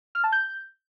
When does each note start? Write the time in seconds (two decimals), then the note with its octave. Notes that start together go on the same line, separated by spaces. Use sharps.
0.15 F6
0.24 A5
0.32 G6